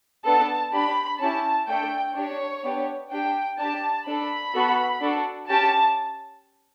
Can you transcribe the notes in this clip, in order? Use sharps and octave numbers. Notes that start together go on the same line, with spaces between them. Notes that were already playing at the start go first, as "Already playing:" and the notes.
B3 D4 A4 A5
D4 G4 B5
C#4 E4 G4 A5
A3 D4 A4 G5
D4 G4 C#5
B3 D4 G4
D4 G4 G5
D4 G4 A5
D4 A4 B5
B3 F#4 A4
D4 F#4 A4
C#4 G4 A5